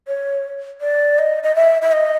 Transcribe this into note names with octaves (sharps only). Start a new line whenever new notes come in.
C#5
D5
D#5
D#5
E5
E5
D#5